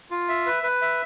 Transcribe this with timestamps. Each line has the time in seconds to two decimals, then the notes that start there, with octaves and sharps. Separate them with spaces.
0.11 F4
0.29 E5
0.46 B4
0.63 B4
0.82 E5